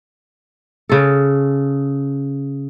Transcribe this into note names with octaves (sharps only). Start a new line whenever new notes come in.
C#3 A4